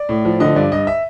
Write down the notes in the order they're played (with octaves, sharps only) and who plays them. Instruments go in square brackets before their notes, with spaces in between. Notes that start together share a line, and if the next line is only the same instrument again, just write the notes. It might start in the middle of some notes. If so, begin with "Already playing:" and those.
Already playing: [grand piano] D5
A2
F3
D3 D#5
G2 D5
G2 D#5
E5